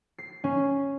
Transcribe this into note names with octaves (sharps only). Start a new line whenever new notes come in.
C7
C#4